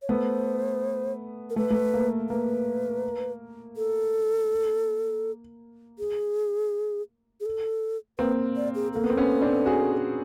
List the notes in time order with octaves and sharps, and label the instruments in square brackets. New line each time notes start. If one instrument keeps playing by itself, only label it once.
[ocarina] C#5
[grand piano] A3 B3 [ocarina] C5
[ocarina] A#4
[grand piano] A3 [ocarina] B4
[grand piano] A3
A#3
[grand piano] A#3 [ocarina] B4
[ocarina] A4
G#4
G#4
A4
[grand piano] A#3 C4 [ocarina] B4
[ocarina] D5
G#4
[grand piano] A#3 [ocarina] A4
[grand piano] B3
C4
B3 C#4
C4 D4
F#4 G#4